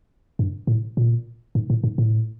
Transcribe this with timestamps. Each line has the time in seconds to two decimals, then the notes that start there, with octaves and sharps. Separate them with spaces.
0.39 G2
0.67 A2
0.97 A#2
1.55 G#2
1.70 A2
1.84 G#2
1.98 A2